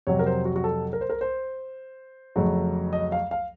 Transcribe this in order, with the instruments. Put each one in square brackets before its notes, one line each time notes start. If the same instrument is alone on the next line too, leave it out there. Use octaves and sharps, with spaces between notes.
[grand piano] F2 C3 F#3 C#5
A#4
C5
F#4
F#4
A4
A#4
C5
A#4
C5
F2 C#3 F#3 A3
D#5
F5
F5